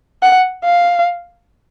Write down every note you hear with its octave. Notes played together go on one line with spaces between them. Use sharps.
F#5
F5